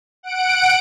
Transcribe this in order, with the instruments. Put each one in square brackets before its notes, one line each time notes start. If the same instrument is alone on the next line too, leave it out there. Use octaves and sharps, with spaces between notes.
[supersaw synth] F#5 D7